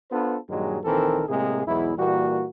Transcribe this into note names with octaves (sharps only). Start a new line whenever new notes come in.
B3 D4 F4 A4 B4 C5
G2 A#2 D#3 F#3 G#3
A#1 D#3 E3 C4 A4 A#4
A2 C3 G#3 A#3 G#4
B1 E2 F#3 G#3 E4
A#2 E3 G3 A#3 F#4